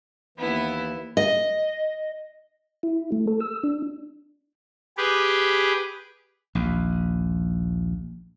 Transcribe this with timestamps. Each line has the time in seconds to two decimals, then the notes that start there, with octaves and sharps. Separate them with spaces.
0.38 D#2 E3 B3 E4
1.17 D#5
2.83 E4
3.12 A3
3.27 A4
3.40 E6
3.63 D4
4.97 G4 G#4 B4
6.55 A#1 D#2